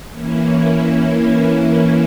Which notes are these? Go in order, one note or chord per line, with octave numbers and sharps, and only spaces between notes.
E3 A#3 C#4 E4